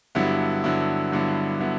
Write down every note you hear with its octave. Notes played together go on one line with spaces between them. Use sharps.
G2 D3 F#3 B3 E4
G2 D3 F#3 B3 E4
G2 D3 F#3 B3 E4
D3 F#3 B3 E4